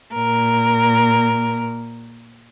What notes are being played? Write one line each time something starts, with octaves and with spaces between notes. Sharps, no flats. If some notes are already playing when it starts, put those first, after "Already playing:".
A#2 A#4